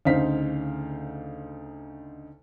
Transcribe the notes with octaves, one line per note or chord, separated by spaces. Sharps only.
D2 C#3 D#4 C5 F5 B6